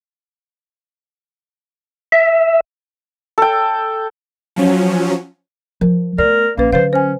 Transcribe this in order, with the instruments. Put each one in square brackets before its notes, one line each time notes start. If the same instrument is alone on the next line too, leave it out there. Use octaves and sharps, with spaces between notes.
[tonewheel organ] E5
[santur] A4 G5
[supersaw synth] F3 F#3 C#4
[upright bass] F3 [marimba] A#4
[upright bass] A3 B3 [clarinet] A#4 [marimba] D5
[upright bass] A#1 [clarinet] A#3 [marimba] C#4 B4
[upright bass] D3 F#3 [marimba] B4 F5 [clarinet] C5
[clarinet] C#4 [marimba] C5 G#5